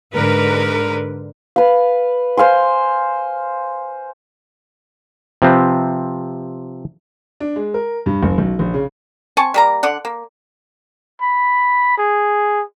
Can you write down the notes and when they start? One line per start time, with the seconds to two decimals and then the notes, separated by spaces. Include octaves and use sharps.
0.14 G#2 D3 A#4 B4
1.56 B4 F5
2.37 C5 F5 G#5 C6
5.42 C3 F3 C4 B4
7.40 D4
7.56 G#3
7.74 A#4
8.06 G2
8.23 F#1
8.38 B1
8.59 A#1
8.74 C#3
9.37 C4 G#5 A5 C#6
9.54 G3 A#3 A#5
9.83 D3 D5 F#5
10.05 A#3
11.21 B5
11.98 G#4